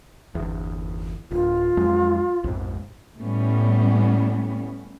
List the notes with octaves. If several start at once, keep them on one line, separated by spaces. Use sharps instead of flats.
G1 E2
D1 F4
F2 F#3 G#3
A#1 F2 G#2
A2 G3 B3 C#4